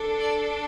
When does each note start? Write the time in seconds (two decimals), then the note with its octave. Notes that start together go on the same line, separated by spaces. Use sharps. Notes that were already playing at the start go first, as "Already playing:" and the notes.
Already playing: D4 A4
0.20 D5